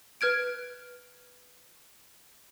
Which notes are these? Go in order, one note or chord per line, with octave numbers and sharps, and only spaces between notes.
B4 F6 G#6 D7